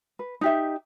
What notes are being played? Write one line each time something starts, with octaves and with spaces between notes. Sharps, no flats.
B4
D#4 G4 E5